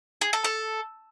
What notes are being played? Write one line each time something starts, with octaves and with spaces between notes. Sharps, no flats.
G#4
A4
A4